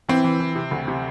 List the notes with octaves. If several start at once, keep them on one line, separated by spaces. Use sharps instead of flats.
E3 C4
E3
E3
C3
D2
C3